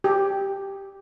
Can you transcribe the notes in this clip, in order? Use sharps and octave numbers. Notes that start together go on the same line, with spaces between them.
G4